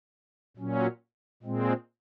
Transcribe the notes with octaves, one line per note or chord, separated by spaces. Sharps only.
A#2 F#3 C#4
A#2 G#3 C4